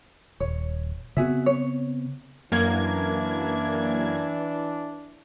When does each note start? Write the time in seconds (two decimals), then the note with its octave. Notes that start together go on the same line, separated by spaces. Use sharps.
0.40 D#1 C#5
1.17 C#3 B3 C4 F#4 G#4 E5
1.46 C#5
2.52 F#2 E3 A#3 D4 G#6